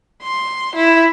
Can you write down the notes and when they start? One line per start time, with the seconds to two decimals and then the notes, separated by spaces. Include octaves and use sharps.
0.23 C6
0.76 E4